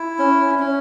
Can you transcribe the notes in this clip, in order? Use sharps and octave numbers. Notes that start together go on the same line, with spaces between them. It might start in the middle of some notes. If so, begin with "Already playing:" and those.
Already playing: E4
C#4
C#4